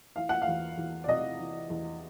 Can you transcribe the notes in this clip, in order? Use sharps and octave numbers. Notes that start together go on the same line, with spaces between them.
E3 F5
F#5
F5
E2
E2
D5
C3 D#5
E3
E2